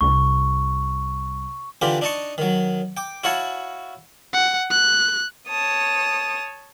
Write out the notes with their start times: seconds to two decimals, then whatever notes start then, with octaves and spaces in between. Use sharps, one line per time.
0.01 C2 C#6
1.82 D3 E3 D4 F4 G4
2.01 D4 D#4 D#5 A5 C#6
2.38 D#3 F#3
2.97 G5 D6
3.24 E4 F#4 C#5 F5 A5 C#6
4.34 F#5
4.71 F#6
5.49 C#5 A5 D#6